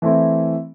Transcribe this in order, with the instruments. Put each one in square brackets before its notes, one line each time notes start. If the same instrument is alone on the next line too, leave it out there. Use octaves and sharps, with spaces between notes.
[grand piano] E3 A3 C4 E4